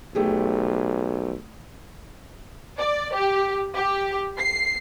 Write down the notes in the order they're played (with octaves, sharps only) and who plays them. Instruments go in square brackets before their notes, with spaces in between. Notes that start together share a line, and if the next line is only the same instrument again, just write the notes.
[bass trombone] B1 [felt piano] A3 G4 G#4
[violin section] D5
G4
G4
C7